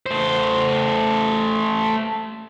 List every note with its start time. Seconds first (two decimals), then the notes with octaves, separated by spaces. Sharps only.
0.06 A3 C5